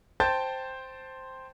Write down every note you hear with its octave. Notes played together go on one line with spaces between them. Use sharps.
C5 G5 A5 G6 A6